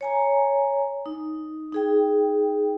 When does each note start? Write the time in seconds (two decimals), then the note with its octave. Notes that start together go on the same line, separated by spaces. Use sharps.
0.01 C#5 G#5 A#5
1.06 D#4
1.73 D#4 G#4 G5